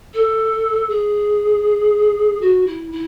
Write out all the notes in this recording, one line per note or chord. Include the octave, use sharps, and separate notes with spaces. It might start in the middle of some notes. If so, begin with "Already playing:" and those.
A4
G#4
F#4
E4
E4